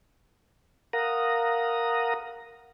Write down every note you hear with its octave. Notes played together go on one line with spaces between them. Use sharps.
A#4 F5 F#5 A#5 D#6 A#6